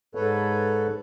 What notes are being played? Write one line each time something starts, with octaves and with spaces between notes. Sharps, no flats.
G#2 A4 B4 C#5